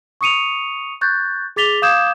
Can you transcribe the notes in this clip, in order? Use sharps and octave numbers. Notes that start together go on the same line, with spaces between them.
C#6 D#6 C#7 D#7 F7
C#6 F#6 G6 A6
G#4 D6 A6 B6 F7 G7
F5 D6 D#6 G6 G#6 E7